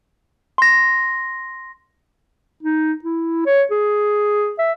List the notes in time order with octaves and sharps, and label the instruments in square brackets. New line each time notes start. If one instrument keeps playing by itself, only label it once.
[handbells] C6 A#6
[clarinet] D#4
E4
C#5
G#4
E5